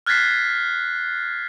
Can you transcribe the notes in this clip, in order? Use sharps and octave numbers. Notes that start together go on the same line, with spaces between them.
F6 F#6 G#6 A6 B6 C7